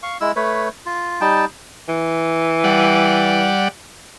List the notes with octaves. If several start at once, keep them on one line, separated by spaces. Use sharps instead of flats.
F5 C#6
G#3 E4 E6
A3 B4 C#5
F4
G3 D#4 G5 A5
E3
G3 D5 F#5